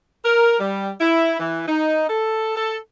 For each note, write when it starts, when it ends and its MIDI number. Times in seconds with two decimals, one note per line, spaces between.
0.24 0.57 70
0.59 0.92 55
1.00 1.35 64
1.39 1.64 52
1.68 2.08 63
2.09 2.55 69
2.56 2.77 69